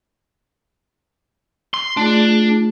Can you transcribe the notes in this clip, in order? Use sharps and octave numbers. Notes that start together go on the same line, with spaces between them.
C6
A3 D4 F4 G#4